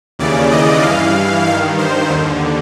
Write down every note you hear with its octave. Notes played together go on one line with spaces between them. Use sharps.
D#2 C#3 E3 D5
D#5
G2 E3 F5
G2 D#3 F5
C5
D#2 D3